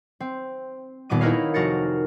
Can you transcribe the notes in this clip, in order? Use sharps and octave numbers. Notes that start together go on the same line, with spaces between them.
C4
D#1 A#2 B3 D6 D#7
D#4 E4 A#4 B4 C#5 F5
F1 F#4 A#4 F5 A6 C#7